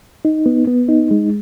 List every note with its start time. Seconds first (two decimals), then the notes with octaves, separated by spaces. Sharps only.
0.25 D#4
0.46 B3
0.68 B3
0.89 D#4
1.11 G#3